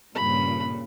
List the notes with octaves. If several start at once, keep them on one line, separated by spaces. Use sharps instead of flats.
G2 A#2 C#3 B5